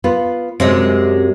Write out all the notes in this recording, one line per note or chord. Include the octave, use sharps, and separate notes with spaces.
B3 F4 B4
F#2 C3 G#3 C4